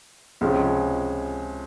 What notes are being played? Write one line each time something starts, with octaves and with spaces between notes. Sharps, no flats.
C#2 C3 F3 G#3 C#4